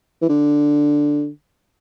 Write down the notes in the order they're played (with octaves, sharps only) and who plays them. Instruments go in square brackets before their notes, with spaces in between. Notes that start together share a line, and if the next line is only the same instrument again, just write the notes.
[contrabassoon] E3
D3